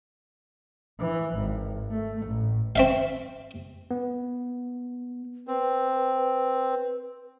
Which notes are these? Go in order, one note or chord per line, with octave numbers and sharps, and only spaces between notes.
E3
G#1
A3
A1
C4 E5 F5
B3
C4 B4